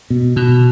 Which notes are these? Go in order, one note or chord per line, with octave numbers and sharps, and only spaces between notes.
B2
B2